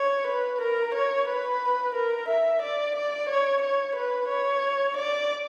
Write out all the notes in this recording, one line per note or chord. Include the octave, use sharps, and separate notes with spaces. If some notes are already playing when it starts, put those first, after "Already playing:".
Already playing: C#5
B4
A#4
C#5
B4
A#4
E5
D5
D5
C#5
C#5
B4
C#5
D5